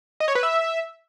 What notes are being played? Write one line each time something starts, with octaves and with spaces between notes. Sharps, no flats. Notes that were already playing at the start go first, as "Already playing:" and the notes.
D#5
C#5
B4
E5